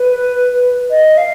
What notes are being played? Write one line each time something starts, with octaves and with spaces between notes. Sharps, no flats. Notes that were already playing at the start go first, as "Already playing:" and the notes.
Already playing: B4
D#5
F5